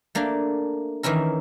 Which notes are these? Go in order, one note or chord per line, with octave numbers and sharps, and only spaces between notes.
A3 A#3 D4
D#3 E3 C#4 E4 A#4